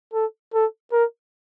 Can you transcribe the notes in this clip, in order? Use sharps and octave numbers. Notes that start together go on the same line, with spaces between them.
A4
A4
A#4